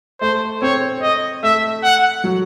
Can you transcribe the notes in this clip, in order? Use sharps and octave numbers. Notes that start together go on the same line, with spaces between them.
A3 C5
C4 C#5
D#5
A3 E5
F#5
F#3